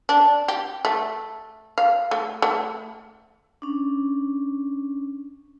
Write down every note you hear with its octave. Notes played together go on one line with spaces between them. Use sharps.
D4
G4
A3
F5
A3
A3
C#4 D4